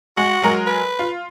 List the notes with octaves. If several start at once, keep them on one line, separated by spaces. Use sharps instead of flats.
G#3 F#4
F#3 G#3 A#4
B4
F4